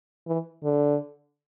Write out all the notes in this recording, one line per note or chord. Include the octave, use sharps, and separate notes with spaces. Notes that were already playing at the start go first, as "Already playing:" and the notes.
E3
D3